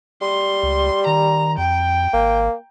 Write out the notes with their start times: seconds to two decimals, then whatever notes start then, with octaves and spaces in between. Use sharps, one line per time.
0.22 G3 C6
0.63 C#2
1.06 D#3 A#5
1.58 F2 G5
2.13 G#1 A#3